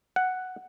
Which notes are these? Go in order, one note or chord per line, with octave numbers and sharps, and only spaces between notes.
F#5